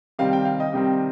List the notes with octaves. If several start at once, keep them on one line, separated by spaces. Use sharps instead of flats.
C3 D#3 G3 C4 F5
G5
F5
D#5
C3 D#3 G3 C4